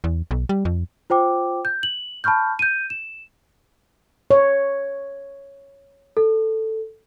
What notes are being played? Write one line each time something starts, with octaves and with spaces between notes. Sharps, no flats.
E2
B1
G3
F2
F4 C5 G5 D6
G6
F#7
A5 B5 C#6 F6 G6
G6 D#7
E7
C#5
A4